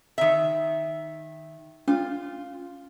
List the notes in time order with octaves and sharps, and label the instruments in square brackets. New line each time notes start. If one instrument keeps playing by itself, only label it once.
[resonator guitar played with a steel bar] D#3 E5
[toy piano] C#4 [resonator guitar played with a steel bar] F4